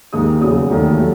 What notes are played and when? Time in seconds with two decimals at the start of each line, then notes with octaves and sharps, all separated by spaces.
0.13 D#2 D#3 G#3 D#6
0.41 E2 C#3 F#3 D#6
0.70 D#2 D#3 A3
0.99 F#3 A3